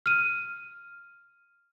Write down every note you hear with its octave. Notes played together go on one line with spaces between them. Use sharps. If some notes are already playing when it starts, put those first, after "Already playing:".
F6 D#7